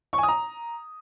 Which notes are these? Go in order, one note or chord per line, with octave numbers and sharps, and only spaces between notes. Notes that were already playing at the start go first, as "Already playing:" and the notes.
C#6
G#5
D#6
A#5